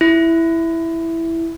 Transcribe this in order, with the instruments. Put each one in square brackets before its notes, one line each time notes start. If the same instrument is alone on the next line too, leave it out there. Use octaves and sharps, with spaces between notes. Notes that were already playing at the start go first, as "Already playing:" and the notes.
[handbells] E4